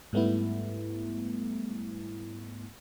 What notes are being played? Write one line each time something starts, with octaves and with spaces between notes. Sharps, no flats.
G#2 G3 A3 B3 E4